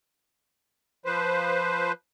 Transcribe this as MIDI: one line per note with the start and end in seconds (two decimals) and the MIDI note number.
1.06 1.92 53
1.06 1.92 71
1.06 1.92 72